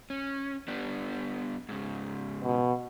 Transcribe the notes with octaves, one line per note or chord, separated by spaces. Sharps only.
C#4
G3 B3 D4
G#2 C#3
B2